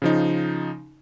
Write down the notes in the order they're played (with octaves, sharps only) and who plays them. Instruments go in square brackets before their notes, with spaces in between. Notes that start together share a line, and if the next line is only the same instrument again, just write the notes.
[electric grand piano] C#3 F3 D#4